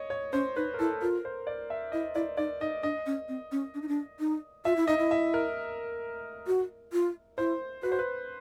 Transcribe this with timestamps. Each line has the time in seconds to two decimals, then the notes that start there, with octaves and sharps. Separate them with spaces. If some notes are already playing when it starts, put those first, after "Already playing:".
Already playing: C#5 D#5
0.10 C#5
0.33 C#4 C5
0.56 D#4 B4
0.74 A#4
0.79 E4 A4
1.02 F4 A#4
1.25 C5
1.47 D5
1.70 E5
1.92 E4 D#5
2.15 E4 D5
2.37 D#4 D5
2.61 D#4 D#5
2.83 D4 D#5
3.06 C#4
3.29 C4
3.52 C#4
3.74 D4
3.82 D#4
3.88 D4
4.20 D#4
4.65 F4 E5
4.76 E4
4.87 D#4 D#5
4.98 E4
5.11 E5
5.34 A#4
6.47 F#4
6.93 F4
7.38 E4 C5
7.83 F#4 B4
7.92 C5
7.99 B4